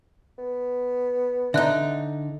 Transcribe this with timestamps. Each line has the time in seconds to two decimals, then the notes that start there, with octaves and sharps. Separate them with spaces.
0.38 B3
1.54 D3 D#4 E5 F#6